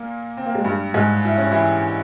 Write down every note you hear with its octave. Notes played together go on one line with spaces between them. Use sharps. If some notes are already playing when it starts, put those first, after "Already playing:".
Already playing: A#2 A#3
C4
A#3
G#3
G2 G3
G#2 G#3
E4
C#4
E3 E4